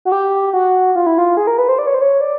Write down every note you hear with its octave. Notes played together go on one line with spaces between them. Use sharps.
F#4
G4
F#4
F4
E4
F4
G#4
A#4
B4
C5
D5
C#5
C5
C#5
D5